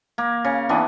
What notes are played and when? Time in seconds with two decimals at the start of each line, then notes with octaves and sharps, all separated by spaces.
0.18 A#3
0.45 C#3
0.69 E3 B3 D4